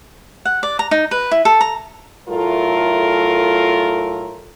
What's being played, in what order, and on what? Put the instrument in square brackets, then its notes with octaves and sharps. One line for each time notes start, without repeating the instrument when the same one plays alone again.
[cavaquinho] F#5
D5
A#5
D#4
B4
E4
A4
A#5
[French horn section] A2 F#3 A3 F4 A4 A#4